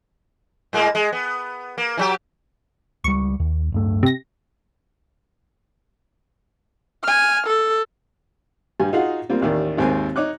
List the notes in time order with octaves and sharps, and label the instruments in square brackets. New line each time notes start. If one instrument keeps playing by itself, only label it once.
[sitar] A2 G#3 A#3
G#3
B3
A#3
E3 F#3 G4
[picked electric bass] C#2 G3 [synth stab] C#6
[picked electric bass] D#2
D1 G2 A3
[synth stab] C3 A#6
[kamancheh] G#5 F6
A4
[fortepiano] G2 G3 G#5
D#4 F4 F#4 G#4 F5 F#5
G3 A#3 C4 F4
A1 D#2 D#3 D5
G#1 D#2 G#3 C4 A#4 G#5
D#4 C#5 D6 F#6